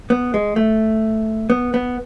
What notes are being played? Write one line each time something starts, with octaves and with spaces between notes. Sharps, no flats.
B3
G#3
A3
B3
B3